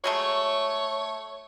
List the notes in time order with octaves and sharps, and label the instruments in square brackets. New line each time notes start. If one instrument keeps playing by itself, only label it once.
[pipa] F#3 G#3 A3 [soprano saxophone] C#5